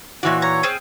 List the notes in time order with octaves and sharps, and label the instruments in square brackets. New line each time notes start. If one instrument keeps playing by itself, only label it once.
[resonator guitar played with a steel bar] A#2 E3 F#4 [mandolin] C#5 D5
[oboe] C#5 [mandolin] A#5
[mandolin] C4 G#4 F6